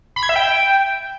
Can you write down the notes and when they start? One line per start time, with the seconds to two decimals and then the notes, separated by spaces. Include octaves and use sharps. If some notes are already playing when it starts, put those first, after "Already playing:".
0.16 B5
0.23 G#6
0.29 E5
0.36 G5